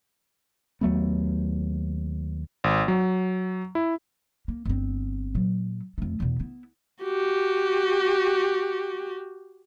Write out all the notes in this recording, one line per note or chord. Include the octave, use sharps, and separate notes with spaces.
D#2 F#3 A3 B3
G#1
F#3
E4
A#3
G1 C4
A#2 F#3
F2 A3
E2 B2
B3 E4
F#4 G4